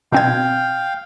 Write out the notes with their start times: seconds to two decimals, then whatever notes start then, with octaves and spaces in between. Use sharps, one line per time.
0.12 B2 C4 F5 G5 G#6